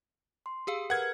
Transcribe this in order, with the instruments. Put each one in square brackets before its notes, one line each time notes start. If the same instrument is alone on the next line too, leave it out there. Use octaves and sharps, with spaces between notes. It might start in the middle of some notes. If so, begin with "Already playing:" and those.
[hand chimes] C6
[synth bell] G4 G#4 F5
[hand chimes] A#4 B4 F6 [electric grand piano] F#5 G#6